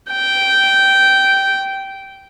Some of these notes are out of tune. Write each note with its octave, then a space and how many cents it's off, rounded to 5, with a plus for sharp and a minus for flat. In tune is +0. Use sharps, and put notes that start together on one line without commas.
G5 -10